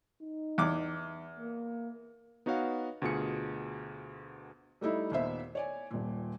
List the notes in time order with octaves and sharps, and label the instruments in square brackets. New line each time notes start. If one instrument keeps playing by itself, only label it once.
[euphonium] D#4
[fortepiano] E2 D6
[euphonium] A#3
[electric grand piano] B3 D#4 F#4 C#5 F5 F#5
D2 B2 F4 G#4 C#7
[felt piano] G3 A3 D#4 E4
D#2 A#2 B3 C5 E5
C#5 D5 G#5
D#1 A#2